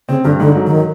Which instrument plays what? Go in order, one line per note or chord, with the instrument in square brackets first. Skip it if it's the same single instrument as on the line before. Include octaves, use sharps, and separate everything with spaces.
[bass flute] C#3 [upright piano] C4
[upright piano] G2 [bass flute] D3
[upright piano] G#2 [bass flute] D3
[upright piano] F#3
[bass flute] D3
D#3